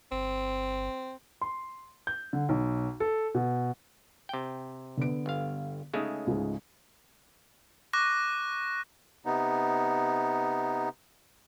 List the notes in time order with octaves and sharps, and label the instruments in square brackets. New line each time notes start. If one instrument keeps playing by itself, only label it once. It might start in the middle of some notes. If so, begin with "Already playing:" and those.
[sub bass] G1 [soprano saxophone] C4
[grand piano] C6
G6
D3
B1
A4
B2
[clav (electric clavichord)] C3 G5
[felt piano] D3 B3 D7
[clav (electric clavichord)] G1 F5
[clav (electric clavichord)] C#3 G#3 A3 [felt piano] C#4 D#4
[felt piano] C#2 G#2
[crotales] C#6 D6 F#6 A#6
[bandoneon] C3 B3 D#4